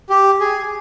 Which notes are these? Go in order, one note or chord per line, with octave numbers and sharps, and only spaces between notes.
G4
G#4